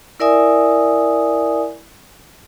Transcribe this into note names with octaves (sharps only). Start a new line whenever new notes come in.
E4 A#4 D5 E5 G#5 D#6